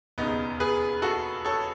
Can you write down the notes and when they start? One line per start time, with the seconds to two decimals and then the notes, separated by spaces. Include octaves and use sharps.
0.18 E1 D#2 C#3 B3 D#4
0.60 G#4 B4
1.02 F#4 A4
1.45 A4 C#5